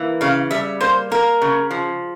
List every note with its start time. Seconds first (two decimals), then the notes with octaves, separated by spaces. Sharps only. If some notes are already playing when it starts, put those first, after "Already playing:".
Already playing: E3 A#3
0.21 C#3 F5
0.51 G3 E5
0.81 A#3 C5
1.11 A#3 A#4
1.42 C#3
1.71 F3